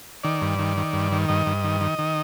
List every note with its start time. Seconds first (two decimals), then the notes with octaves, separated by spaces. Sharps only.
0.24 D#3 D5
0.42 G2
0.59 D#3
0.77 D#3
0.93 G2
1.12 D#3
1.28 G2 D#5
1.46 G2
1.64 D#3
1.81 D#3
1.99 D#3